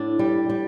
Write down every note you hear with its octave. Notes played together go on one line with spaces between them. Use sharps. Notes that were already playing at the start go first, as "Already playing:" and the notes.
Already playing: A2 D4
G3
G3